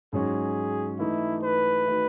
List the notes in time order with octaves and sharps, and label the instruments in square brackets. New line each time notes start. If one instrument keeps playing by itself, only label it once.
[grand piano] G#2 F#3 C#4 F#4 [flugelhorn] G#4
[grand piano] E3 A3 D#4 [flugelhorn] E4
[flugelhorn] B4
[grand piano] D#3 A3 D#4 F#4